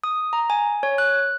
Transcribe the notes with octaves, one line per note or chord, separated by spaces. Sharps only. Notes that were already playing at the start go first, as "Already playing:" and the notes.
D#6
A#5
G#5
C#5
F#6